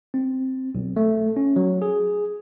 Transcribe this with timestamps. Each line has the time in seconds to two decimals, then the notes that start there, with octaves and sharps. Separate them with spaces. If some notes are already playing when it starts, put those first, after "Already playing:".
0.14 C4
0.75 B1
0.96 A3
1.36 C#4
1.56 F#3
1.82 G#4